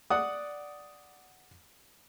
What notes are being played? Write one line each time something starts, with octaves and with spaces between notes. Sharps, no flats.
D5 F#5 D#6